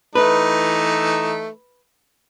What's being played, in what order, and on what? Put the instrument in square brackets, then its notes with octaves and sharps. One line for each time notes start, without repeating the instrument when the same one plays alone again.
[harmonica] E3 A3 D#4 [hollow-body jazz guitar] B4